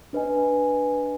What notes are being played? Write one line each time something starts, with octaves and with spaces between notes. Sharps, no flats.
D4 B4 D#5 G#5